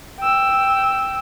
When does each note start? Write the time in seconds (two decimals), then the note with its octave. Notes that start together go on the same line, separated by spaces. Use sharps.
0.20 G5 E6